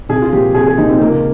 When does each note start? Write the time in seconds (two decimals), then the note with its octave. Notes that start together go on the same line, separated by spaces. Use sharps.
0.09 C2 G#4
0.22 F4
0.32 A#2 F3 G4
0.55 C2 G#4
0.66 G#4
0.78 A#2 F3 D#4
0.89 C4
0.99 C#2 A#3